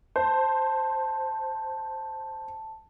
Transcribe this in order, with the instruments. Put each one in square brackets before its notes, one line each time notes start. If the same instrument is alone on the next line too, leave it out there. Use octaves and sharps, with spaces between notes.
[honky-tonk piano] C5 [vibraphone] A5